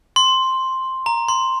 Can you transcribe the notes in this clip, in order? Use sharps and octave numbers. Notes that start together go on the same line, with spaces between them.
C6
A#5
C6